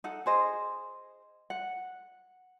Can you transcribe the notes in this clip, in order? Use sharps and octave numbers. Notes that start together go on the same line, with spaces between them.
D#4 A4 F#5
G#4 C5 D#5
F#5